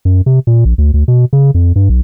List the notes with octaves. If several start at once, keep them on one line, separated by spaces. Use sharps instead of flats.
F#2
C3
A#2
A#1
D2
D2
B2
C#3
F2
G2
B1